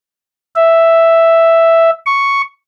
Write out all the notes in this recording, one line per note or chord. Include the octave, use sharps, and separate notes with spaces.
E5
C#6